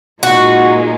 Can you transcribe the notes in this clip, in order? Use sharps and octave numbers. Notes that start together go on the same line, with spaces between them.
A#2 G#3 D#4 F#4